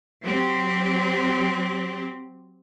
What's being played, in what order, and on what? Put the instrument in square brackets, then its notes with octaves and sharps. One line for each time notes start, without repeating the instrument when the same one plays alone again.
[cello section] F#3 C4 G4